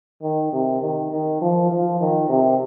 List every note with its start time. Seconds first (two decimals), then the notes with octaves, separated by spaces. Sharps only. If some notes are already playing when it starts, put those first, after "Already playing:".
0.22 D#3
0.53 C3
0.81 D#3
1.11 D#3
1.41 F3
1.70 F3
2.00 D#3
2.29 C3